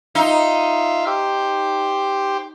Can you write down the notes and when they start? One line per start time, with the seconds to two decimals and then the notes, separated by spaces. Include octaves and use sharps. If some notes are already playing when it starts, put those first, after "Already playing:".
0.15 D#4 F4 E5 F5
1.07 G4 C5